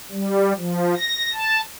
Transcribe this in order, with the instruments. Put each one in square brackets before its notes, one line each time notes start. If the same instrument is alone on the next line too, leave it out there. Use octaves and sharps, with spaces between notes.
[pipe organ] G3
F3
A#6
A5